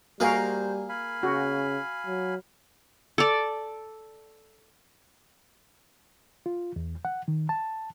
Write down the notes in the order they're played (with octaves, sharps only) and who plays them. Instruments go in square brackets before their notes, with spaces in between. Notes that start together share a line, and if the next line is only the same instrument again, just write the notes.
[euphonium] G3 [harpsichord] A#3 G#4 [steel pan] F#4 A#4 F5 [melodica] C5
[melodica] F5 G#5 B5
[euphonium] C#3 [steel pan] F#4
[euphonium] F#3
[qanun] A4 D5
[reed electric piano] F4
E2
F#5
D#3
A5